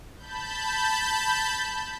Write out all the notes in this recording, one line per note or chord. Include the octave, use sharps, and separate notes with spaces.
A5 B5 G6